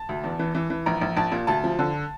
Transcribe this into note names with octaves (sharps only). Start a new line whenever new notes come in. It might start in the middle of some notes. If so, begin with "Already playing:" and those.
Already playing: A5
D2
E2
E3
E3
E3
A#1 A#5
A#1
A#1 A5
A#2
D2 A5
F3
D3